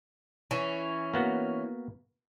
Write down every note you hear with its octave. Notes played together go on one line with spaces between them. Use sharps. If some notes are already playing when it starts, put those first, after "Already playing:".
E3 C#4
A#3 B3 F#4